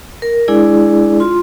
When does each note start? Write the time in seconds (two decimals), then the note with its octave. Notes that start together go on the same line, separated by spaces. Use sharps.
0.22 A#4
0.48 G#3 D4 E4 G#4 D5
1.20 F4 C6